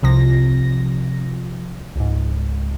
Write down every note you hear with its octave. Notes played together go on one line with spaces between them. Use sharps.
C2 C3 F3 A#6
C#2 G#2